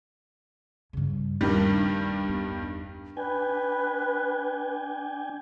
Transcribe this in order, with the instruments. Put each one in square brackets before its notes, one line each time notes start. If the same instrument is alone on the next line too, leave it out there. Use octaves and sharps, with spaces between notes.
[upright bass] G2 C#3
[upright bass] D#1 [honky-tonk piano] G2 D#3 G3
[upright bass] E2 B3
[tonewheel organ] D4 G5 G#5 [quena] B4